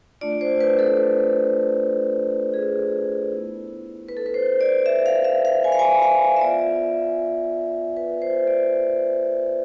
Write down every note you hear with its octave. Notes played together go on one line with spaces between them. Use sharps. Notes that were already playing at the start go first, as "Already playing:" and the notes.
A3 D4 F4 D5
C5
B4
A4
G#4
B3 E4
B4
A4
B4
C5
D5
E5
F5
E5
F5
G#5
F5
G#5
F5
E5
B3 F4 D5
B4
C5
D5